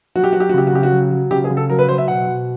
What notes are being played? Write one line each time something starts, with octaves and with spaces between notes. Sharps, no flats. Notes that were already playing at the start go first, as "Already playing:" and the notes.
F#3 F#4
G4
F#3 F#4
G4
F#4
C#3 G4
F#4
C#3 G4
F#4
F#3
F#3
C#3 G4
G#4
C#3
A4
F#3 A#4
B4
F#3 C5
E5
B2 F#5
B2